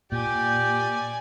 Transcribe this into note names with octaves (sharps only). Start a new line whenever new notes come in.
A#2 G4 D5 G#5